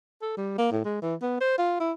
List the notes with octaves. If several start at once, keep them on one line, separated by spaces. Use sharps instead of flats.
A4
G3
A#3
A2
G#3
E3
B3
C5
F4
E4